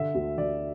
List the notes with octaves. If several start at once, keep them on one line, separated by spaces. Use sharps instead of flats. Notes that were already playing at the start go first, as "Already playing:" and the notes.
Already playing: D3 E5
D2
D3 D5